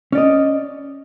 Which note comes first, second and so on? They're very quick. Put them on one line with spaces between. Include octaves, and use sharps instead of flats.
C#4 D5 D#5